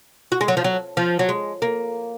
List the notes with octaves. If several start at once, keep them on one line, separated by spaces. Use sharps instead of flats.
F#4
G#3
F#3
F3
F#3
F3
F#3
G#3
A#3